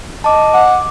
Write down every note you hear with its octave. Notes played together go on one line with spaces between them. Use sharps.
D#5 A5 D6
F#5 D6